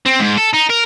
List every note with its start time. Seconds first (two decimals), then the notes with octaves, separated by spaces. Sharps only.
0.06 C4
0.20 G#2
0.38 A4
0.54 D#4
0.70 A#4